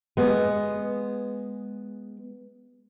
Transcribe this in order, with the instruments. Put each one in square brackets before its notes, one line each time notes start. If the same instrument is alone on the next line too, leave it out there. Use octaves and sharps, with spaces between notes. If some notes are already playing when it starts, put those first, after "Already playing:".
[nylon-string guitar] G#3 B3